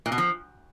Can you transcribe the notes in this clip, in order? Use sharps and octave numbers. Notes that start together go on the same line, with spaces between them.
A#2
B2
F3